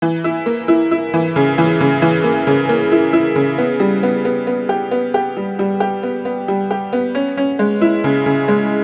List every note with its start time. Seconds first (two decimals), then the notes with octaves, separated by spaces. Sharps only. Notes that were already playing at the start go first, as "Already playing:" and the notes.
0.02 E3
0.24 E4
0.46 A#3
0.68 E4
0.91 E4
1.14 E3
1.36 C#3
1.58 E3
1.80 C#3
2.02 E3
2.24 A#3
2.47 C#3
2.69 A#3
2.92 E4
3.13 E4
3.36 C#3
3.58 B3
3.80 G3
4.03 B3
4.25 B3
4.47 B3
4.69 G4
4.91 B3
5.14 G4
5.37 G3
5.59 G3
5.80 G4
6.03 B3
6.25 B3
6.48 G3
6.71 G4
6.93 B3
7.15 C#4
7.37 C#4
7.59 G#3
7.81 E4
8.04 C#3
8.26 C#3
8.48 G#3